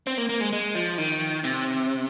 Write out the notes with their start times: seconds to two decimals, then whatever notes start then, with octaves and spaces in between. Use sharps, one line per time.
0.07 C4
0.18 A#3
0.29 A#3
0.41 G#3
0.53 G#3
0.75 F3
0.98 D#3
1.44 C3